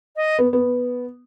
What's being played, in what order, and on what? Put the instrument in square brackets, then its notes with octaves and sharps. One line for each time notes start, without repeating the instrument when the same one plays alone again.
[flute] D#5
[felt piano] B3
B3